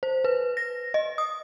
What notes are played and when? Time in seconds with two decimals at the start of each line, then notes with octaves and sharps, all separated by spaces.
0.03 C5
0.24 B4
0.57 A#6
0.94 D#5
1.18 D#6